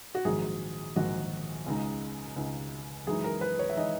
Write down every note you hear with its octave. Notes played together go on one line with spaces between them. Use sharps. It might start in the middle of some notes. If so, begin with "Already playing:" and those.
F#4
A#1 G#2 D#3 F#3 G#4
A#1 G#2 D#3 F#3 F#4
C#2 C#3 G#3 D#4
C#2 C#3 G#3 D#4
F#2 E3 G#3 D#4 G#4
A#4
B4
C#5
E5
E3 G#3 D#4 D#5